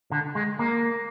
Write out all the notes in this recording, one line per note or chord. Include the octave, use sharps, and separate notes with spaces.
D3
G#3
A#3